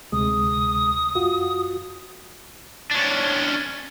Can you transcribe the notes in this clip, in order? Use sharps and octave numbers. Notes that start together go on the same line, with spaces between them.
D2 C3 G#3 D#6
F#2 F4 F#4
C#4 D4